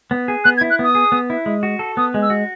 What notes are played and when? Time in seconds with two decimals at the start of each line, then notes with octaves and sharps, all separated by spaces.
0.11 B3
0.28 G#4
0.44 B3 F#6
0.57 G#6
0.61 E4
0.70 F#6
0.79 B3 D#6
0.95 G#4
1.12 B3
1.30 E4
1.46 G#3
1.63 F#4
1.79 A4
1.97 B3 D#6
2.14 G#3
2.22 E6
2.30 F#4